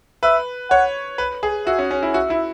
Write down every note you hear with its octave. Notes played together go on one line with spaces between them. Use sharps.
B4 E5
C#5 F#5
B4
G#4
F#4 E5
C#4
C#4
E4
F#4 E5
E4